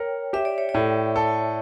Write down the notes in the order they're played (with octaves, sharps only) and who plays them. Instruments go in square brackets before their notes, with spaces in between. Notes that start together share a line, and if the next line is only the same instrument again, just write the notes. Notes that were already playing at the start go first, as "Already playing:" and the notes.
Already playing: [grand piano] A#4 [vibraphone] C#5 G5
[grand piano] G4 [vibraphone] E5
[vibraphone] D5
C#5
D5
[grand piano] A2
A4